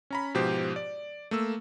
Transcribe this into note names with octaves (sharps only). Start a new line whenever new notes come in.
C#4 A#5 B5
G#2 B2 F3 G4 C5
D5
A3 A#3 E6